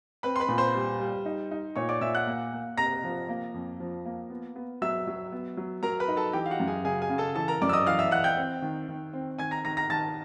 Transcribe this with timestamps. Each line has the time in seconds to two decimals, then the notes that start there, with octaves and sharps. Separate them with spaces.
0.23 C4 B4 B5
0.36 C6
0.40 B4 B5
0.48 A#2
0.58 C5 C6
0.75 G3
1.00 G3
1.26 D#4
1.51 D#4
1.76 A#2 C#5 C#6
1.89 D5 D6
2.01 A#2 E5 E6
2.15 F#5 F#6
2.27 A#3
2.53 A#3
2.78 C3 A#5 A#6
3.04 F3
3.29 A#3
3.54 F2
3.80 F3
4.05 A#3
4.30 B3
4.56 B3
4.82 F#3 E5 E6
5.07 F#3
5.32 B3
5.57 F#3
5.83 F#3 A#4 A#5
6.00 B4 B5
6.08 D#4
6.17 A4 A5
6.33 E3 G4 G5
6.46 F5
6.51 F#4 F#5
6.60 F#2
6.68 G#4 G#5
6.85 C#3 G#4 G#5
7.02 G#4 G#5
7.10 C#3
7.18 A4 A5
7.35 E3 A4 A5
7.48 A#4 A#5
7.62 F#2 D5 D6
7.69 E6
7.73 D#5 D#6
7.86 E3 F5 F6
7.99 E5 E6
8.11 E3 F#5 F#6
8.24 G5 G6
8.37 C4
8.62 D#3
8.88 D#3
9.13 C4
9.39 D#3 G#5 G#6
9.51 A#5 A#6
9.65 D#3 A#5 A#6
9.77 A#5 A#6
9.89 D#3 A5 A6